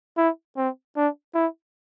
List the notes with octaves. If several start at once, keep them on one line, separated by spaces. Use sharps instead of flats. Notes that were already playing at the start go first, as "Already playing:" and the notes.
E4
C4
D4
E4